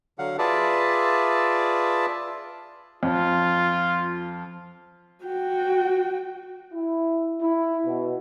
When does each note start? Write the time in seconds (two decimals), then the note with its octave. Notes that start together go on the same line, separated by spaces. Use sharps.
0.18 D3 F#3 F5 F#5
0.39 F4 G#4 B4 D5 E5 A5
3.03 F2 F4
5.24 F#4 G5
6.73 E4
7.41 E4
7.85 B2